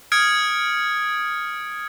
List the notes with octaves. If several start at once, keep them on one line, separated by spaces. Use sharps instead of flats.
D#6 F6 G#6 C#7 D7